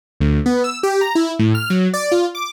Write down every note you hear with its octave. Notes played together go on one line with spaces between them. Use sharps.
D2
B3
E6
G4
A#5
E4
A2
F6
F#3
D5
F4
D6